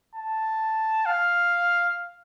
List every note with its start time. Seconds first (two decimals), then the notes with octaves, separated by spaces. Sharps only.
0.16 A5
1.06 F5